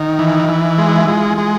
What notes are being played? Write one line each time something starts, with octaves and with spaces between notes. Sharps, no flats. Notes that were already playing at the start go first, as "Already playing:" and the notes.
Already playing: D#3 D#4
E3
E3
G#3
E4
G#3 F4
G#3